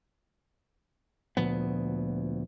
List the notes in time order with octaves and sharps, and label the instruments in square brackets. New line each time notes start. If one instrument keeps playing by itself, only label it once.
[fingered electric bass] D2 A#2 F3 B3